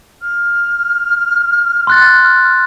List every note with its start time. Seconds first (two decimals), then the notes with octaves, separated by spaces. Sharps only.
0.21 F6
1.87 C6 F#6 A6